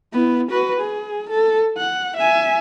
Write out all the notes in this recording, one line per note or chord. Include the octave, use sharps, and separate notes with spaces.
B3 E4
F#4 B4
G#4
A4
F#5
E5 G#5